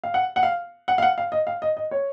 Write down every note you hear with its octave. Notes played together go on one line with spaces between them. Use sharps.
F5
F#5
F#5
F5
F#5
F5
F#5
F5
D#5
F5
D#5
D#5
C#5